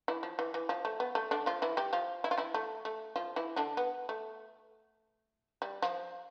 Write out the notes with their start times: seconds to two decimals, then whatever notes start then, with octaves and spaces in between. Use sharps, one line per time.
0.08 E3 E4
0.23 F3
0.39 E3
0.54 E3
0.69 F3
0.85 A3
1.00 B3
1.15 A3
1.31 D3 D4
1.46 F3 F4
1.62 E3 E4
1.77 G3 G4
1.93 F3 F4
2.24 E4
2.31 F4
2.38 E3 E4
2.54 A3
2.85 A3
3.16 F3 F4
3.36 E3 E4
3.56 D3 D4
3.77 B3
4.09 A3
5.62 G3
5.82 F3